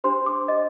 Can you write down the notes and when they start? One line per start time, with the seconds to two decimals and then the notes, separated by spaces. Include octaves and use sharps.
0.04 D4 G4 C5 C6
0.26 D6
0.48 D#5